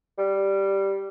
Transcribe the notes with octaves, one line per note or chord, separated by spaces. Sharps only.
G3